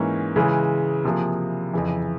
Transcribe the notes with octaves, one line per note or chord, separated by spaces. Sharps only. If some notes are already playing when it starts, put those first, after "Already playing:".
Already playing: G#2 E3 A#3 C#4
C#3 E3 G#3
C3 F3 A#3 E4 G#4
F2 C#3 E3